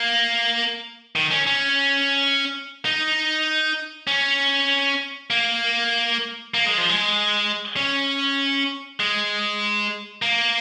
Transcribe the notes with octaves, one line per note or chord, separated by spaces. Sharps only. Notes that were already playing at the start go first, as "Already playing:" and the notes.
Already playing: A#3
D#3
C#4
C#4
D#4
C#4
A#3
A#3
G#3
F3
G#3
C#4
G#3
A#3